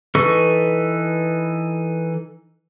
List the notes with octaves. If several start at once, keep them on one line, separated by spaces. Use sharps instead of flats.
E3 D#4 A4 B4 C#6